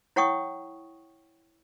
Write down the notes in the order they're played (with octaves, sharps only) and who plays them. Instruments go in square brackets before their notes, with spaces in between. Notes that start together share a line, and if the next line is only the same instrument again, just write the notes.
[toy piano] E4 C#5 F#5 G5 C#6 D#6